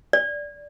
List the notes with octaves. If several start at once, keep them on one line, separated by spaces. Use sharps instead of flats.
D5